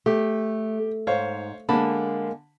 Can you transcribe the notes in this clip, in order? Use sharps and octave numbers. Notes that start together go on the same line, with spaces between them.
A3 G4
G#2 C5 C#5 F5
D3 G#3 A#3 A5 B5